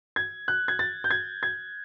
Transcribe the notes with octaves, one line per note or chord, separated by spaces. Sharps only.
G#6
F#6
G#6
A6
G6
G#6
G#6